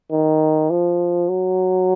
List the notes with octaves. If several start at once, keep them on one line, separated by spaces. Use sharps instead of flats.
D#3
F3
F#3